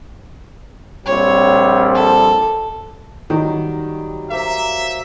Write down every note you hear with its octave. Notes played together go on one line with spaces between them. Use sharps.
A#1 G3 C4 C#5
A4
D#3 F#3 G3
A#3 C5 E5 A#5